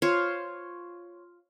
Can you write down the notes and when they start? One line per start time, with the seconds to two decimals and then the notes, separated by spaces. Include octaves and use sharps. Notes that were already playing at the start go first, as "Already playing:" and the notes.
0.02 F4 C5 C#5